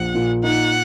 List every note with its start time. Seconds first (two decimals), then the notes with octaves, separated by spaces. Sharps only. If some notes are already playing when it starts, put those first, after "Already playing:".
Already playing: A#1 F3 F#5
0.14 A#2
0.43 D#4 F#5